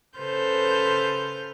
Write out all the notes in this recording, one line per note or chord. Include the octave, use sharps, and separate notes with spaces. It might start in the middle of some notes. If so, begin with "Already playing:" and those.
C#3 A4 B4 C5 F6 G6